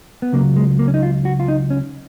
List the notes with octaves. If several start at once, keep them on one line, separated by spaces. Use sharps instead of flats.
B3
C#2 C#3 F#3 A#3
G#3
A#3
C#4
D#4
F4
F#4
F4
D#4
C#4